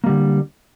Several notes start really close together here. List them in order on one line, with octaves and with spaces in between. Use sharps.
A#3 G3 D3